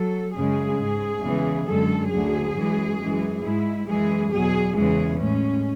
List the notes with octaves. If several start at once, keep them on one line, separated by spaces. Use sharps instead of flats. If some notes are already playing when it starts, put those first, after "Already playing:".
Already playing: F#3 A4
F#2 C#3 G#3 G#4
G#2 G#3
E2 C#3 E3 G#3
F#2 D3 G#3 A4
D2 D3 F#3 G#4
F#2 E3 G#3
F#2 E3 G#3
G#2 G#3 E4
F#2 E3 G#3 G#4
E2 B2 F#3 G#4
E2 C#3 E3 G#3 G#4
A2 G#3 C#4